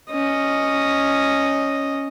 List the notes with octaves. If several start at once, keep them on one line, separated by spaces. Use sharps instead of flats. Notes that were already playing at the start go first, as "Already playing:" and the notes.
C#4 D#5